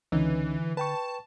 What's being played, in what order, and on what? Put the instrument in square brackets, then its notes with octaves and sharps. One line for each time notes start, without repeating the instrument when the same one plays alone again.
[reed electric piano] C#2 C#4 D#4 [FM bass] D3 [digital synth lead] E3
[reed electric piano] B4 G5 C#6 [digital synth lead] A5